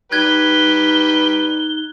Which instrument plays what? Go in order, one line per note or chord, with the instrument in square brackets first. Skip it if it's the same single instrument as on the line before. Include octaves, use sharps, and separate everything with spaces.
[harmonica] G3 B4 G5 [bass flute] D#4 [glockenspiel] F#6 G#6 [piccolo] G7